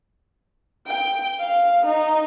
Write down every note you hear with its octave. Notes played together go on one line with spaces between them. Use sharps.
G5
F5
D#4